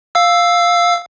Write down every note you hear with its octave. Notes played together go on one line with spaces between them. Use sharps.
F5 E6